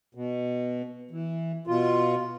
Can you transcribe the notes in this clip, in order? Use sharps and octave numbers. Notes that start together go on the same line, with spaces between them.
B2
E3
B2 F4